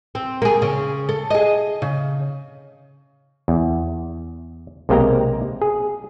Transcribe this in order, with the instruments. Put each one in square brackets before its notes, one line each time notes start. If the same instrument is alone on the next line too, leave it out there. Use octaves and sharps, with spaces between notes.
[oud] C4
A#3 G#4
C#3
A4
G#4 D#5
C#3
[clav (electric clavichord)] E2
B1 C3 G#3 A#3 G5 A#5
G#4